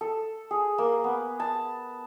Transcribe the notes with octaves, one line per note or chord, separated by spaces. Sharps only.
A4
G#4
A#3
B3
A5